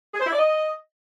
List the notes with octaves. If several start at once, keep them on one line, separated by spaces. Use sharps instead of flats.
G#4
C5
E4
D5
D#5